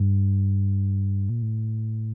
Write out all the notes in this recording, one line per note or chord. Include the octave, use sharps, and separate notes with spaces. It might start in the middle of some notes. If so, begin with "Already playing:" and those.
Already playing: G2
A#2
A2